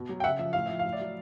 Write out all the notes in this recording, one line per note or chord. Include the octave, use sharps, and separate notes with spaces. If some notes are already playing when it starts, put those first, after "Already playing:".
Already playing: B2
F#3
G5
C#3 E5 F#5
F3 E5
A2 F5
F3 E5
F5
A2
D5 E5
F#3